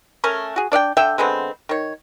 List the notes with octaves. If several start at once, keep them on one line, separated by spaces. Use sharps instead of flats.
A3 C#4 A#4 G#5
F#4 G#4
D4 D5 F5 G5
D3 E5 G5
D3 G#3 B3 C4
D#3 C#5